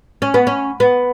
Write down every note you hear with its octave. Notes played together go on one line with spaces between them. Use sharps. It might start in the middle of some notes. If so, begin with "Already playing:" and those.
C#4
B3
C#4
B3